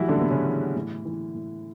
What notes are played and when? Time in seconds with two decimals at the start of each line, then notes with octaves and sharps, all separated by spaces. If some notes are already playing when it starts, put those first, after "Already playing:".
Already playing: A2 E3 F#3 G3 E4 F#4
0.09 D3 D4
0.16 A2 B3
0.30 C#3 C#4
0.46 E3
0.75 A2
1.05 E3
1.34 A2